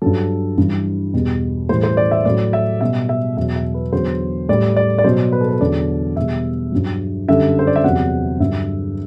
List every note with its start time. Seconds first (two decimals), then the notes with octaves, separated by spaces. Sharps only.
0.02 G2 F#3 A4
0.58 G2 E3 G3
1.14 E2 B2 G3
1.69 A2 E3 G3 C5
1.83 C5
1.97 D5
2.11 E5
2.25 A2 F#3 D5
2.53 E5
2.81 B2 G3 E5
3.09 E5
3.37 E2 B2 F#3 E5
3.56 E5
3.74 B4
3.92 E2 D3 F#3 C5
4.49 A2 G3 D5
4.77 D5
4.99 D5
5.04 B2 F#3 C5
5.32 B4
5.41 A4
5.49 B4
5.61 E2 D3 F#3 D5
6.16 E2 B2 G3 E5
6.72 G2 F#3
7.28 F#2 D3 G3 E5
7.59 C5
7.67 D5
7.76 E5
7.84 E2 C3 F#3 F#5
8.40 G2 D3 F#3 E5